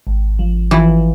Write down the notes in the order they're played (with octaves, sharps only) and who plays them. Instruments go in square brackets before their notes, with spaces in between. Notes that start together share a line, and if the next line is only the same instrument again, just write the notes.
[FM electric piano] G#1
F3
[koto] E3 [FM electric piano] F3